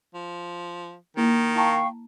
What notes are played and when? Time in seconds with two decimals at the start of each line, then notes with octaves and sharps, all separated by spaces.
0.15 F3
1.17 D#3 A#3 E4
1.56 E4 F5 G5 A5 A#5 C#6